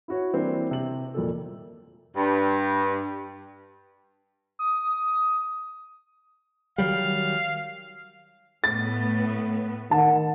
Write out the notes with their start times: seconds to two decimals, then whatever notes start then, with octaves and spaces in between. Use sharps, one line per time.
0.08 E4 F#4 C#5
0.33 E3 G3 A#3 C4 D4
0.71 C3 F#7
1.14 F2 A#2 A4
2.17 G2
4.59 D#6
6.78 D#3 F#3 G3 F5
8.64 A2 B3 A6
9.91 D#3 F#5 A5